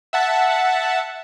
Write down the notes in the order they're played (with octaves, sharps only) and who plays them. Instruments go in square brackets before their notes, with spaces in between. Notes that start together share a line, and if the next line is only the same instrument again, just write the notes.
[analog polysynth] E5 F#5 A5